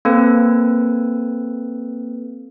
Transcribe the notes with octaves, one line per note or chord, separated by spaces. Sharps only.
A#3 C4 A4 B4